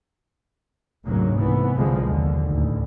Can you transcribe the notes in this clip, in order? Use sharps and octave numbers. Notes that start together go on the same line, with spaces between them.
F1 D2 G#2 F#3 A#3
C2 E3 B3
B1 F2 D3 F3 G#3
D#2 D3
A1 D2